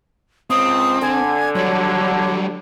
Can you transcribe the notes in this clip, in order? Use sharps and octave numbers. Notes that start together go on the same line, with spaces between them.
C#2 C4 D#6
D3 G#5
F#3 G3 C#5